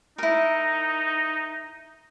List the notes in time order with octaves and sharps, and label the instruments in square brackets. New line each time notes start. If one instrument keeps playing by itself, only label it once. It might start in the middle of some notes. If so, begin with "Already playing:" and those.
[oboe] D#4 [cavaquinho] E4 A#4